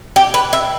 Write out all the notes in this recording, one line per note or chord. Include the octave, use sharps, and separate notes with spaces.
G4
B4
E5